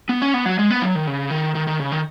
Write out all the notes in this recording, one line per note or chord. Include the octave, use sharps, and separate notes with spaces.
B3
C#4
B3
F#3
G#3
B3
F#3
D#3
C#3
D#3
D#3
D#3
C#3
D#3